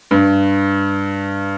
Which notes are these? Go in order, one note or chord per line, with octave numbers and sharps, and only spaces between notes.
G2